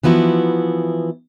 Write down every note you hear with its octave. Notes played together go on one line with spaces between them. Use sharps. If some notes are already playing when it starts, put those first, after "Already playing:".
E3 F3 B3 E4 F#4